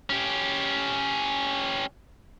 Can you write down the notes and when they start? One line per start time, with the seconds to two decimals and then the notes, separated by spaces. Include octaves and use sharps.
0.10 C#4 G4